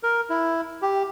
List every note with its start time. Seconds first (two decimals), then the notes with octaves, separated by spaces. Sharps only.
0.03 A#4
0.30 E4
0.82 G4